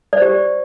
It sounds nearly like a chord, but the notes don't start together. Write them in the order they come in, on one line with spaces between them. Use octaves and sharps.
D5 C5 G4